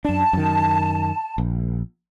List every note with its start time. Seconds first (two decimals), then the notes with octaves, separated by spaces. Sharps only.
0.05 F#2 D4 A5
0.33 F#2 D#3
1.38 A#1